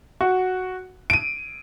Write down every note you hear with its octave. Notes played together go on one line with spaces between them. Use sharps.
F#4
D7 D#7